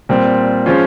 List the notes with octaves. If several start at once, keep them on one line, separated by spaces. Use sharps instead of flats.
A#2 G3 C4
F3 G#3 C#4 F4